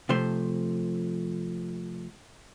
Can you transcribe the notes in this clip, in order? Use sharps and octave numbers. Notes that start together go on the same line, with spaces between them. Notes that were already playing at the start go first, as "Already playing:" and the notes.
C3 F3 A3 C5